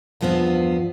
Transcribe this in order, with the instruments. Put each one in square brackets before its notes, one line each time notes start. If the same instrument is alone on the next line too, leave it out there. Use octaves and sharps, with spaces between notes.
[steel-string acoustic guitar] E2 G2 F3 B3 C4